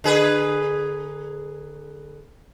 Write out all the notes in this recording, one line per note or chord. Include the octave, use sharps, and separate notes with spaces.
D3 G#4 B4